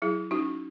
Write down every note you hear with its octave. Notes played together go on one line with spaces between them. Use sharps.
F#3 E4 G#4
C#4 D#4 F#4